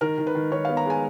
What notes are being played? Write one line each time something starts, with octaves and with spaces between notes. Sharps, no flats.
D#3 A#4
D#3
B4
D#3
D#3 C#5
B3 F5
A#5
G#3 G#5